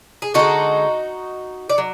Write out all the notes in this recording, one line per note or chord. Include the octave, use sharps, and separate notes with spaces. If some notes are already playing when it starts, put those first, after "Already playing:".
G#4
D3 G#3 D#4 F#4
D5
F#3